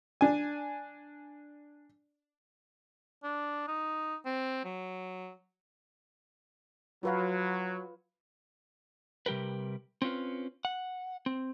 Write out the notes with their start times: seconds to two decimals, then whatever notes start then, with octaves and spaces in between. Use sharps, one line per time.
0.21 D4 G#5
3.23 D4
3.68 D#4
4.25 C4
4.65 F#3
7.03 F#3 F4 B4 F5
9.26 C3 G3 G4 A#4 B4
10.02 C4 C#4 F4 B4
10.65 F#5
11.26 C4